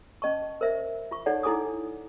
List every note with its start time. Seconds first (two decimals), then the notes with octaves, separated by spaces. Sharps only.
0.22 C#4 D#5 A5 C#6
0.61 A#4 C5 E5
1.11 F4 C#6
1.26 D#4 A4 C#5 D5 F#5
1.43 D#4 E4 A4 G#5 D6 D#6